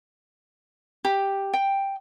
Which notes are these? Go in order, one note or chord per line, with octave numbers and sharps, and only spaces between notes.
G4
G5